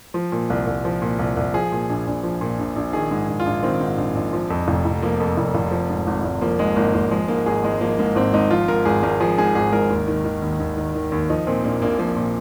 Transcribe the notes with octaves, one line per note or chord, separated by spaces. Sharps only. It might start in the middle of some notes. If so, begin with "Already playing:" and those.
F3
A#2
C2
C2
F3
A#2
C2
C2
F3 G#4
A#2
A#1
A#1
F3
A#2
A#1
A#1
D#3 G#4
G#2
A#1
F4
A#1
D#3 C4
G#2
A#1
A#1
F3
F2
F1
F1
F3 A#3
F2
F1
F1
F3
G#2
G#1
G#1
F3 A#3
G#2 G#3
G#1 A#3
G#1 A#3
F3 G#3
G#2 A#3
G#1 G#4
G#1 G#3
F3 A#3
G#2 A#3
G#1 C4
G#1 D#4
F3 F4
G#2 A#4
G#1 G#4
G#1 A#4
F3 G#4
G#2 G#4
G#1 G#4
G#1 A#4
D#2
D#3
D#3
D#2
D#2
D#3
D#3
D#2
F3 D#4
A#2 C4
A#1 A#3
A#1 A#3
F3 A#3
A#2